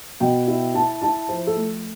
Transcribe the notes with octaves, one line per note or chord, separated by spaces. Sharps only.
B2 G5
E4
E4 A5
E4 A5
F3 C5
A4
A3